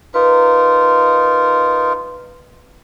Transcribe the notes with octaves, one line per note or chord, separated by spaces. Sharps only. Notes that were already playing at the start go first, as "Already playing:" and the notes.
D#4 F4 A#4 B4